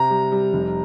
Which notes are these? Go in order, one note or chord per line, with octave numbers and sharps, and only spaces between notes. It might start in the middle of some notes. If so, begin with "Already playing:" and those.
Already playing: C3 A#5
G3
G3
F1